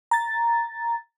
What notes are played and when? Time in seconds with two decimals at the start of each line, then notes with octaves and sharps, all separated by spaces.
0.11 A#5 A6